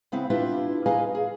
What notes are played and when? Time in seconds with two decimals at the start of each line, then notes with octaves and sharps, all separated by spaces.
0.12 C#3 B3 C4 E4
0.30 D4 E4 F4 G4 B4 E5
0.86 G#4 B4 D#5 F5 G#5 A#5
1.15 G#4